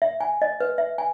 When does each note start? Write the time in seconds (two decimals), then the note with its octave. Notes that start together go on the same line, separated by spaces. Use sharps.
0.02 E5
0.20 G#5
0.42 D#5
0.60 B4
0.78 E5
0.98 G#5